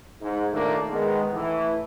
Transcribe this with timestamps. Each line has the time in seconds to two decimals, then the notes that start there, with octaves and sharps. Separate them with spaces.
0.21 G#2
0.52 D#2 A#2 D#3 A3 A#3 D4
0.90 D#3 G#3 B3
1.32 A2 E3